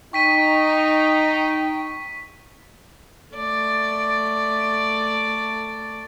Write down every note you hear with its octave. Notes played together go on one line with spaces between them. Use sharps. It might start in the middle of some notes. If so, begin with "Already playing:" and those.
D#4 G5 C#6 B6 D#7
A3 D5